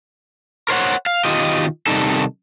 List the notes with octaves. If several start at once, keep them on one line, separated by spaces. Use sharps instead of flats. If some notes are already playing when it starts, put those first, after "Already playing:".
A#4 C5 C#5 F#5
F5
B2 D#3 F4 G4 D#5
C3 D#3 G3 D#4 A4